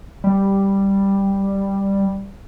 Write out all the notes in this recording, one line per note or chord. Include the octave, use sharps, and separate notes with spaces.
G3